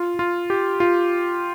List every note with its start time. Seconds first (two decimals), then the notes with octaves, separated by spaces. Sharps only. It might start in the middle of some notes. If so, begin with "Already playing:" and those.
Already playing: F4
0.19 F4
0.50 G4
0.80 F4